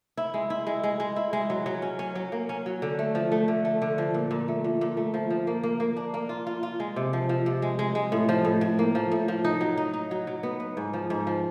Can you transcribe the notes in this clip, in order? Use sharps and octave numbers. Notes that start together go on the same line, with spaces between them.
E4
G#3
E4
G#3
G#3
G#3
E4
G#3
F#3
F#3
C#4
C#4
F#3
A#3
C#4
F#3
D3
A3
F3
A3
D3
A3
D3
F3
A#2
A#2
A3
A#2
A#2
A3
F3
F3
A#3
A#3
A#3
D4
A#3
F4
F4
F4
G#3
C3
F3
F3
C3
G#3
G#3
G#3
A2
F3
A2
A2
A#3
F3
A2
F3
D#4
F#3
D#4
D#4
F#3
F#3
B3
B3
G#2
F3
G#2
F3